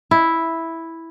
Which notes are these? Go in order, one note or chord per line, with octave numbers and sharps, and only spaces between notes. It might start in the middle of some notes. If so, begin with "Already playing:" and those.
E4